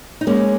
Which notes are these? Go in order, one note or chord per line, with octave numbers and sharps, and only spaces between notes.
D#4
G#3 A#3 C#4